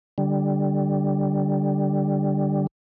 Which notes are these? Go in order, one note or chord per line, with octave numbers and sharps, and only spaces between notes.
D3 G3